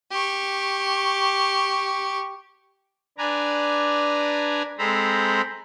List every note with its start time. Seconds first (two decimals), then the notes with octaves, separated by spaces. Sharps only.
0.11 G4 C#6
3.18 D4 B4 D5 G#5 A#5
4.78 G#3 C4 A4 C5 A#5 B5